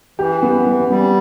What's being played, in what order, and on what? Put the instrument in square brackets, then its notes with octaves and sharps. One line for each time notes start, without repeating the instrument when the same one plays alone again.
[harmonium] E3 [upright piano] G4
[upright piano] B3
B3
[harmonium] G3 [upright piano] B3